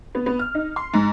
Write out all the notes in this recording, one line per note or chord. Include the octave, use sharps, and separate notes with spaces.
B3
B3
F6
D#4
C6
G#2